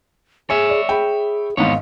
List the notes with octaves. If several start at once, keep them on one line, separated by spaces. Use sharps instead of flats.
G#4 C#5 E5 G#5
D5
G#4 G5 B5
G#1 E2 G#2 B3 C#5 F5